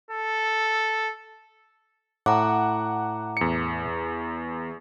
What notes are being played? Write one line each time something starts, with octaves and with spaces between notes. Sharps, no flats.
A4
A2 F#5 A#5 D6
E2 C#7